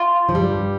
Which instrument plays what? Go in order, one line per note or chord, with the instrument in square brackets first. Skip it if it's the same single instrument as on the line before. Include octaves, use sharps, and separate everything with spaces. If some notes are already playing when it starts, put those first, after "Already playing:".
Already playing: [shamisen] F4
[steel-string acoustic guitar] F3
G2 G3